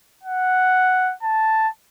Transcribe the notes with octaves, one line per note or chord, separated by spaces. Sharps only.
F#5
A5